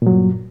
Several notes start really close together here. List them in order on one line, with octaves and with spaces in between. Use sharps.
A#2 F#3 G2